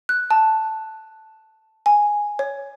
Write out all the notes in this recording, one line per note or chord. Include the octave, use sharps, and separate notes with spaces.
F#6
A5
G#5
C#5